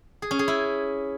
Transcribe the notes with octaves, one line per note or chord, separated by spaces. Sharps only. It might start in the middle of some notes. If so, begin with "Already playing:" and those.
G#4
C#4
G#4
E4